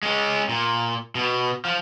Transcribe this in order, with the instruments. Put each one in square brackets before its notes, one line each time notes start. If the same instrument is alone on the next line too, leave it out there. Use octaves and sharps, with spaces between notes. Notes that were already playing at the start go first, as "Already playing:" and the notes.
[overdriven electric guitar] G#3 C#4
A#2
B2
F3